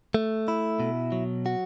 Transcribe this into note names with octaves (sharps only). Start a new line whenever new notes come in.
A3
E4
B2
F#3
F#4